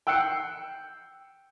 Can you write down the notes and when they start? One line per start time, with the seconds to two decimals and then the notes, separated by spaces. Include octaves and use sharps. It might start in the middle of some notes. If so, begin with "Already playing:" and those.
0.07 G5 E6 F#6 C7 C#7